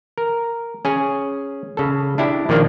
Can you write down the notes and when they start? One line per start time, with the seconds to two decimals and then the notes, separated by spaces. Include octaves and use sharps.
0.18 A#4
0.85 C#4 G#4
1.77 C#3 A4
2.18 D4 E4 G4
2.49 A#2 D#3 F3 A#3 D4